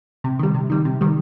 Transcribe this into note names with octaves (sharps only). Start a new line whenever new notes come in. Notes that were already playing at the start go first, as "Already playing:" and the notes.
C3
D#3 G3
C3
D#3 G3
C3
D#3 G3